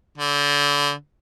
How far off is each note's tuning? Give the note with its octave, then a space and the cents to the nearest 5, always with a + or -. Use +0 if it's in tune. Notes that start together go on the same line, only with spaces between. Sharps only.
D3 -30